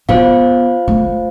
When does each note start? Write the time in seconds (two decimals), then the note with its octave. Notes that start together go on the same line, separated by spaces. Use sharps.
0.09 B3 F4 C5 F5
0.88 A3